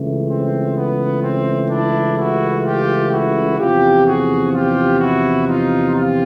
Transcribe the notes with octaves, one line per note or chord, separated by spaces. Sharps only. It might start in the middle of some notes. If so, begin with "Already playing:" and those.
Already playing: C#2 C#3 E3 A3
C4
B3
C4
D4 E4
E4 F#4
F4 G4
E4 F#4
E2 C3 F3 F4 G4
F#4 G#4
F4 G4
E4 F#4
D#4 F4
F4 G4